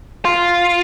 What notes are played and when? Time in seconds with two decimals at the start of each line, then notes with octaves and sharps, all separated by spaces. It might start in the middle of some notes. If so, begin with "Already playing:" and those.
0.25 F4